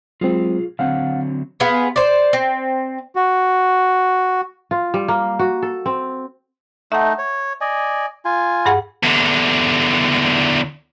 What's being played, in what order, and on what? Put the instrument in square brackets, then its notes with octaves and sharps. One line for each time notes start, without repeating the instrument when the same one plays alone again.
[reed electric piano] F#3 G#3 C4 [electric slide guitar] F4 G#4
[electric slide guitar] D3 F#3 C4 [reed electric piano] F5 F#5
[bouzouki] B3 F4 G#4
C5 D5
C4
[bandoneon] F#4
[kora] F4
G3
A#3
F#4
A4
C4
[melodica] A3 D#4 [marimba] E5 F#5
[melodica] C#5
D5 D#5 G#5
F4 G#5
[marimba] G2 G#4 F#5
[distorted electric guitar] E2 D3